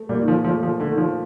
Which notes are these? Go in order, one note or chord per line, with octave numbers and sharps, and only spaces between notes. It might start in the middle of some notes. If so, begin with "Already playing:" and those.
Already playing: A3
A#2 G3
D#3
F3
F3 A3
F3
D3 A3
D#3
F3